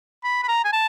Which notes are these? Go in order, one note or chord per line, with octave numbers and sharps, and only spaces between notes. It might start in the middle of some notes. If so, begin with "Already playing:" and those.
B5
B5
A#5
G#5
A5